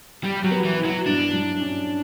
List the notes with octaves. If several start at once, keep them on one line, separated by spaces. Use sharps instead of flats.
G3 G4
F#3
B3
E3
E4
F#3
G2 D4
F#3
C#4